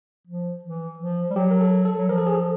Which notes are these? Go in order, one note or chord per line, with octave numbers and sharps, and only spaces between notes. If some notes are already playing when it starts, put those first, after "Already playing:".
F3
E3
F3
G3
F#3 G4
A#4
A4
A4
F#3
F3 A#4
A4
G#4
A4